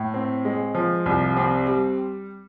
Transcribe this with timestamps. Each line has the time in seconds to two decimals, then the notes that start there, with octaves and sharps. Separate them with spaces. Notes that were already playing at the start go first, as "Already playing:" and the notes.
Already playing: A2
0.14 C4
0.45 G#3
0.75 F3
1.06 C2
1.37 C4
1.67 G3